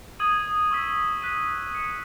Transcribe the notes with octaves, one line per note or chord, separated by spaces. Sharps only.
D#6 G#6 D#7 F#7
C#6 E6 B6
F#6 B6 D#7 F#7
G#6 C#7 E7